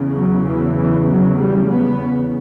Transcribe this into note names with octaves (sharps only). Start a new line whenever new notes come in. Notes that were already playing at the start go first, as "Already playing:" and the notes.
Already playing: E2 C#3
F#3
E3
E3
F#3
G3
B3